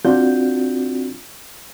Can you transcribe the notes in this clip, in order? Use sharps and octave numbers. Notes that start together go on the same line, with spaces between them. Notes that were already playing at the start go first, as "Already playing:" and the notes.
C4 D4 F4 F#4 G6